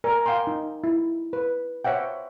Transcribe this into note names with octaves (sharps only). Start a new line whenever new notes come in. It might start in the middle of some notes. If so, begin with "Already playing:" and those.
A#4 D5 G#5
F5 G5 G#5 C6
D#4
E4
B4
C5 C#5 E5 F#5 G5